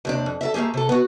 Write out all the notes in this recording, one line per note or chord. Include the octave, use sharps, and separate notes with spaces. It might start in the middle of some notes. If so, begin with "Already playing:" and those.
D#2 C3 D4
F2
A4 A#4 E5
A3 A#3 D4 G4 G#4
C3 A4
B3 F#4